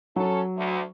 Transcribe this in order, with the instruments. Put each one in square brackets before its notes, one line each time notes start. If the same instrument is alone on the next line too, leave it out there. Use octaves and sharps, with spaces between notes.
[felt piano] F#3 [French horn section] C#4 A4
[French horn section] D2